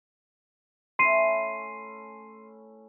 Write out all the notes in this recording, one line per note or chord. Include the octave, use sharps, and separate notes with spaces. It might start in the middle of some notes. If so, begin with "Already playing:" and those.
A3 C#4 E4 C6 C7 D#7